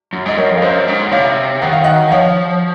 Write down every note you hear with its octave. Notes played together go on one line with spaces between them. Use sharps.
F#2
G#2 D#5
F#2 A#4 C#5
F2
F5
F#2 C5 D#5
G#2
F#5
C3 C#5 F5
D#3 F#5
F5
D#5 F#5
F3 C#5 F5